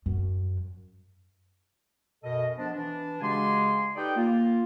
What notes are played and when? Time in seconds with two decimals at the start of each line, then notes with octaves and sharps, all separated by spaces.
0.06 F#2
2.23 F#2 B2 A4 A#4 D#5
2.58 F3 B3 D4
2.73 E3 D4
3.21 C#3 G#3 F#4 G4 G#5 C6
3.96 D#4 G4 A4 B4 D5 G5
4.15 A#3 F4